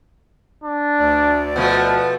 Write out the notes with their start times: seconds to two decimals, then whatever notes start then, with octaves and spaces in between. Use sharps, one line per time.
0.64 D4
1.00 D2 D5
1.56 B2 F3 A3 F#5